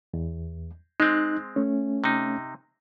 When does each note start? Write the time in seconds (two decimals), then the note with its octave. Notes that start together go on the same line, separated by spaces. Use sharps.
0.14 E2
1.00 G#3 C4 D#4 F#6
1.56 A3 C#4
2.04 C3 D#4